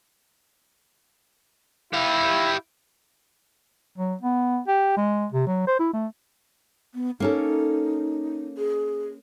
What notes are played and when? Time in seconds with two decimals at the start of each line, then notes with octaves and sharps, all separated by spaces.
1.93 E4 G4 F5
3.98 F#3
4.21 B3
4.68 G4
4.97 G#3
5.32 C3
5.47 F#3
5.67 C5
5.79 E4
5.93 A3
6.94 B3
7.20 A#3 C#4 D#4 A4
8.58 G#4